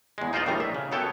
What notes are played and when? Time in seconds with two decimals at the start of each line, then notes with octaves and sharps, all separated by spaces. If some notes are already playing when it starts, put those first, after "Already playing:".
0.18 E2 G#3
0.33 D#4 F4 C5 D5 D#5
0.46 A#1 A2 D#3 G3 A#5
0.60 E5
0.75 C#3
0.92 F#2 B3 A4 C#5 G5